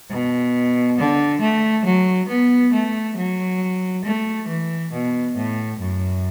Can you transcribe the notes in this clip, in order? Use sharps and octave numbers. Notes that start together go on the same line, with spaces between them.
B2
D3
A3
F#3
B3
A3
F#3
A3
E3
B2
A2
F#2